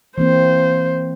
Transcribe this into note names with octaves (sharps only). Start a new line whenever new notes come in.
E3 A#3 C4 C5